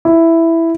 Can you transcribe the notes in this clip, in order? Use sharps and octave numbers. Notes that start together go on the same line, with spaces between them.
E4